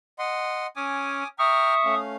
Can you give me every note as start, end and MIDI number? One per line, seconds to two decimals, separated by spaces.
0.19 0.67 75
0.19 0.67 78
0.19 0.67 84
0.76 1.24 61
0.76 1.28 80
0.76 1.28 86
0.76 1.28 87
1.39 1.95 76
1.39 1.74 79
1.39 1.74 82
1.39 1.95 85
1.39 1.99 87
1.39 1.74 89
1.85 2.17 57
1.85 2.17 61
1.85 2.17 77